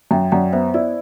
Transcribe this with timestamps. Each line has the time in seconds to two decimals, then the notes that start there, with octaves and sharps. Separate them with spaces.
0.11 F#2 E5 G5
0.32 F#2 D5 F#5
0.53 B3 C5 E5
0.74 E4 D5